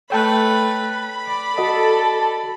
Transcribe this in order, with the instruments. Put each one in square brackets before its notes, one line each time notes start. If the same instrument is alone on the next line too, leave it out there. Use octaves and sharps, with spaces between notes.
[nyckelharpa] A3 B4 [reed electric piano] C#5 G5 A5 [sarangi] B5
[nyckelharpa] D5
[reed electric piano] F#4 D#5 [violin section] A4